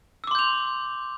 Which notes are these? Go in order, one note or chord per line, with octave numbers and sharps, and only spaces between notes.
C6 D6 E6 G6 F7